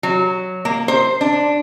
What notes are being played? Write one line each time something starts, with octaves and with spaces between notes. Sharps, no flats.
F#3
A#3
C5
D4